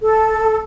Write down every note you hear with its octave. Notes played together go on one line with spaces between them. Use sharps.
A4